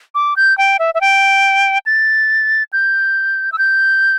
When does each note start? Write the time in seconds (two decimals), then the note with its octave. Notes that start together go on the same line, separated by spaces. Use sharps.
0.15 D6
0.37 G6
0.58 G5
0.79 E5
0.95 E5
1.01 G5
1.86 A6
2.73 G6
3.52 E6
3.58 G6